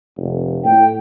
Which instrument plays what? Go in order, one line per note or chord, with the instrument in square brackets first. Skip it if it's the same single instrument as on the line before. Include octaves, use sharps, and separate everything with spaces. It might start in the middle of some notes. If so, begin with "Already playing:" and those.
[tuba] F1
[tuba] A2 [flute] G5